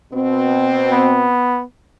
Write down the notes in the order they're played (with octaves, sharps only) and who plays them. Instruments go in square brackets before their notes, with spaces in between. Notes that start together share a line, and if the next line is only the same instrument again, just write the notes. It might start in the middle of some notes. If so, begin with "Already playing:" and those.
[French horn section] B2 C4
[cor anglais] B3